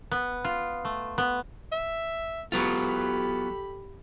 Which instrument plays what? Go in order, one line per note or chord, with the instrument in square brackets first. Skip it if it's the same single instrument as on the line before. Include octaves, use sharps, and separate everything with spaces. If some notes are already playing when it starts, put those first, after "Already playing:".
[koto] B3
F4
A3
B3
[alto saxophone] E5
[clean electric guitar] F#3 B3 F4 [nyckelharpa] G4 B5 [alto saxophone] A4